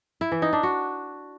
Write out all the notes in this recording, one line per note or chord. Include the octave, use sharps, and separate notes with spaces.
E4
E3
D#4
D4
F#4